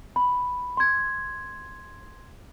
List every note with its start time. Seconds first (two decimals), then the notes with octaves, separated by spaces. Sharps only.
0.16 B5
0.77 C6 G#6